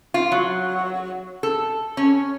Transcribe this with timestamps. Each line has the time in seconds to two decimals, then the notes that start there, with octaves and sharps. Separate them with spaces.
0.14 F4
0.32 F#3
1.43 A4
1.97 C#4